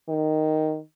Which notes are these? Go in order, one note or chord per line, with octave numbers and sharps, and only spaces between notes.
D#3